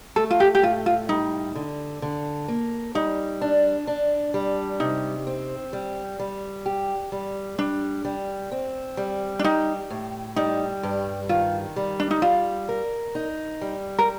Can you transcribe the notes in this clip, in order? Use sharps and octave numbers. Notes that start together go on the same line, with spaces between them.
A3 A4
F4
G4
G4
A2 F4
F4
G3 D#4
D3
D3
A#3
G3 D#4
D4
D4
G3
C3 D#4
C4
G3
G3
G4
G3
G3 D4
G3
C4
G3
D4
D#4 G4
A2
G3 D#4
G2
D#3 F4
G3
D4
D#4
G3 F4
A#4
D#4
G3
A#4